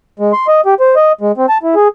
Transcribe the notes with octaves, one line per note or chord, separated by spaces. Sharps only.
G#3
C6
D#5
G4
C5
D#5
G#3
C4
A5
E4
G#4